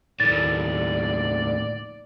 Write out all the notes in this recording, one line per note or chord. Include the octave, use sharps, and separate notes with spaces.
D#2 A2 D5 A6